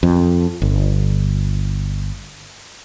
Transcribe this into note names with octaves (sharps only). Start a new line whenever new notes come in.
F2
G1